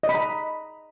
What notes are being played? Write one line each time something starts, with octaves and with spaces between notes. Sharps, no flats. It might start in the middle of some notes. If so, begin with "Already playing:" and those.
D#5
B5
A#5